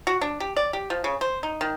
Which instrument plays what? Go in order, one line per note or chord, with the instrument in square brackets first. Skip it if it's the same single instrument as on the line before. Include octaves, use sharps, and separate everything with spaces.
[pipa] F#4
D4
G4
D5
G4
F3
C#3
C5
D#4
D#3